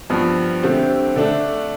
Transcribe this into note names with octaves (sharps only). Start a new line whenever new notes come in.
G2 F3 B3
D3 A3 C4 G4
D3 A3 D4